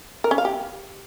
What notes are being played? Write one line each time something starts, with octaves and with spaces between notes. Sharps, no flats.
A#4
C#4
F5
G4